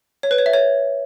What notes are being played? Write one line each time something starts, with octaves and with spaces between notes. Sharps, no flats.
C#5
B4
C#5
E5
C#5